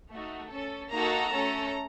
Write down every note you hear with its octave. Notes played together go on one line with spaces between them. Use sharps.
A3 D#4 F#4
C#4 A4
A#3 D#4 F#4 A4 A#5
A3 C#4 A4